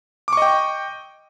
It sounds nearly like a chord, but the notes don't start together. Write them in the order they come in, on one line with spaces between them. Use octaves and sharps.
D6 C#6 D#5 G5